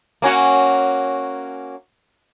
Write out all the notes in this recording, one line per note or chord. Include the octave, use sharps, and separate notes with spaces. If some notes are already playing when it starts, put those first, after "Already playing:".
A#3 C#4 F#4